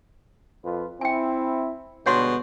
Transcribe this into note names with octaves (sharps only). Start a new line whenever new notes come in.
F2 F4 B4
C4 E4 G5 G#5
G2 B2 D3 G#3 C#5 F#5 C6